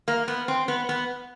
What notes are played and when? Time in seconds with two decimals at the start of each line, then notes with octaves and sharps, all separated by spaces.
0.08 A#3
0.28 B3
0.48 C4
0.68 B3
0.89 B3